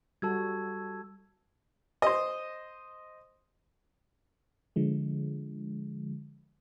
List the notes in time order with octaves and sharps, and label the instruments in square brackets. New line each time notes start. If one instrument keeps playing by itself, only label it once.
[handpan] G3 F#4 A4 [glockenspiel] A5 E6 G#6
[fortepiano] C5 D#5
[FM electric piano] D3 F3 G#3